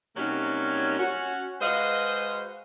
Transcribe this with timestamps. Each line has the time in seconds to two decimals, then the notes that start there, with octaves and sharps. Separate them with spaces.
0.16 C3 F#3 G3 A#3 C#4 D#4
0.99 C#4 F#4
1.61 G#3 F#4 B4 C5 D#5 F5